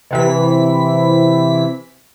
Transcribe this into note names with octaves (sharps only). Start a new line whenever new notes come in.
C3 E3 B6